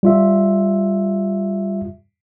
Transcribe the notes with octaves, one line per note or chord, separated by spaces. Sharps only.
G3 F4 E5